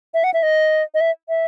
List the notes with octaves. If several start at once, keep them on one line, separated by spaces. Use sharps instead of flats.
E5
F#5
E5
D#5
D#5
E5
E5